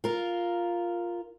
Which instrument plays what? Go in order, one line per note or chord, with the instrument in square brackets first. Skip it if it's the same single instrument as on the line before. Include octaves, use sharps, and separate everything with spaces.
[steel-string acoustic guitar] F4 A#4